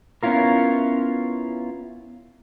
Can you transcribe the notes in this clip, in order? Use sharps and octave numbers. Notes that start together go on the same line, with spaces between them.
B3 C#4 E4 F4 A#4